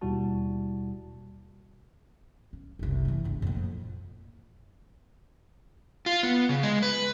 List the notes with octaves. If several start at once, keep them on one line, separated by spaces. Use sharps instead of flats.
D#2 B2 G3 E4 F#4 A5
C#4
F#1 C2
C#3 E3
G1 C#2
F2 A#2
F4
B3
C#3
G#3
B4